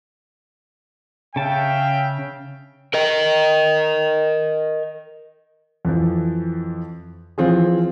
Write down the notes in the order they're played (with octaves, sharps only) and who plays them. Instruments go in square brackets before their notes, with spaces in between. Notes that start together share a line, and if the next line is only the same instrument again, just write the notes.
[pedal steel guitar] C#3 A5 [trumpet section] E5 F5 G5
[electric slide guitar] A#4 D#5
[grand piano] F2 E3 F3
E3 F3 C4 F4 G#4